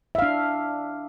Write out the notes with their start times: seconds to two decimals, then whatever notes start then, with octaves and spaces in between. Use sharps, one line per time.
0.15 E5
0.18 F5
0.22 D4